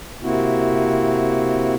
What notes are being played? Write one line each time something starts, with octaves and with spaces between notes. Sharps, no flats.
C3 A#3 C4 E4 F#4